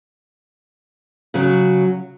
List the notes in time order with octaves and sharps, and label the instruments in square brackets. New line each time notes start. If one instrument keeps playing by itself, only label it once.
[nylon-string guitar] C#3 F#3